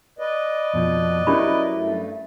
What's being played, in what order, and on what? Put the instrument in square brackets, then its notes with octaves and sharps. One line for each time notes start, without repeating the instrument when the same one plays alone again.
[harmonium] B4 D5 D#5
[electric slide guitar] F2 B2 F3
[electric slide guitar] F#3 E4 A#4 [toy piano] C#4 G4 B5
[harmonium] G2 A3